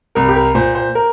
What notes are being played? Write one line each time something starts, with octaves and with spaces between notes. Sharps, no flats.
C2 A#4
G4
A#4
A#2 C5
C5
A#4